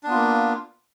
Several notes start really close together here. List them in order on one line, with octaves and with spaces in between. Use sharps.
D4 B3 F4 A#3